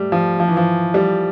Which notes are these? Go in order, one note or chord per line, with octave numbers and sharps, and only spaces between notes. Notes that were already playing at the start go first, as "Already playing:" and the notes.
Already playing: G3 A3
F3
F3
E3
F3
G3